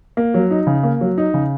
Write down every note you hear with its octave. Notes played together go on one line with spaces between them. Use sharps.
A#3
F#3
D#4
C#3
A#3
F#3
D#4
C#3